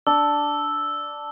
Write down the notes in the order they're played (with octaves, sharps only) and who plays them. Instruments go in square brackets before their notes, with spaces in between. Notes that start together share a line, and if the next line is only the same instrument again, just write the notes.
[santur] D4 [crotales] E6